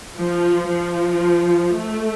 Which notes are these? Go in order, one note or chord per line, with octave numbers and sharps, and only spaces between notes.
F3
F3
A3